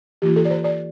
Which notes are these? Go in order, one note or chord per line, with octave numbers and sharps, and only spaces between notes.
E3 A#3 F4 G4
A4
D5
C5
D5